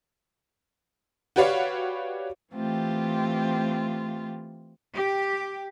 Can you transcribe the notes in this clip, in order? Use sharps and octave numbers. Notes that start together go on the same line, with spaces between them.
F#4 G4 B4 C#5 D5 F5
E3 A3 C4 F4 G4
G4